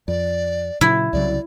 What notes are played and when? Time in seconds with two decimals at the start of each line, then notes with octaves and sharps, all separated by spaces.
0.08 F2 D5
0.81 A#2 C#3 F#3 E4
1.13 C2 C#3 F#3 D5